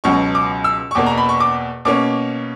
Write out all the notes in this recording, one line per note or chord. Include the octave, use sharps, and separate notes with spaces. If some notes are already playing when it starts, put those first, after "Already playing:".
C#2 B2 F#3 C#6
D6
E6
C#6
E2 B2 A#3 D6
A#5
B5
C#6
D6
B2 A#3 C#4 D6